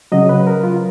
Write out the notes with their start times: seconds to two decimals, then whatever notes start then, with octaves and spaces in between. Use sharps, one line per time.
0.12 C#3 F#3 D#5
0.29 B4
0.47 A#4
0.63 F4